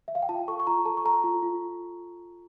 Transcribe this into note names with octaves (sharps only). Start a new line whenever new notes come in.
E5
F5
G5
F4 A5
A4 C#6
C#6
F4 A#5
A4 A5
C#6
A4 A#5
F4
F4